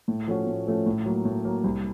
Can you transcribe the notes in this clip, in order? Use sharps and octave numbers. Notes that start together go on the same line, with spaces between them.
A2
F3 A3 C#4 F#4
A2
F3 A3 C#4 F#4
A2
F#3 A#3
A2
F#3 A#3
C2